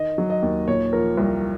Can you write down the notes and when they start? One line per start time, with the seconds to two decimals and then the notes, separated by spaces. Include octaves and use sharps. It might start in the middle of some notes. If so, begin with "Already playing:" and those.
Already playing: D#3 D#5
0.18 F#3
0.30 D#5
0.42 D#2
0.67 A#2 C#5
0.93 F3 A#4
1.18 C2 A#4